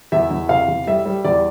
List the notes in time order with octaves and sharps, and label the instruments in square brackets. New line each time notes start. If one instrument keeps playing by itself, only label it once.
[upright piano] E2 E5
E2
C3 F5
E2
G3 E5
G3
E2 D5